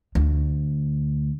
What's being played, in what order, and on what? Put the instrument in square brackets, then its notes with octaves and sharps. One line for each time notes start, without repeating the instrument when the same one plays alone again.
[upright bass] D2